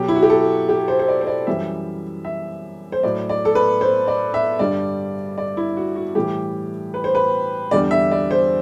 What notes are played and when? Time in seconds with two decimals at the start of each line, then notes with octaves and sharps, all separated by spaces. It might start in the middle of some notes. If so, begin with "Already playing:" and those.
Already playing: B2 F#3 G4
0.08 E4
0.16 F#4
0.23 G4
0.30 A4
0.69 G4
0.88 C5
0.99 C5
1.08 D5
1.21 C5
1.27 D5
1.47 F#2 E3 G3 E5
2.25 E5
2.92 C5
3.03 A2 F#3 D5
3.29 D5
3.45 A4
3.55 B4
3.81 C5
4.08 D5
4.34 E5
4.59 G2 D3 G3 D5
5.38 D5
5.57 E4
5.77 F#4
5.96 F#4
6.15 A2 E3 G3 G4
6.94 B4
7.04 C5
7.15 B4
7.71 E2 D3 G3 D5
7.91 E5
8.11 D5
8.31 C5